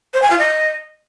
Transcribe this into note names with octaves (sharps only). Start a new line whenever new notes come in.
C5
G#5
F4
D#5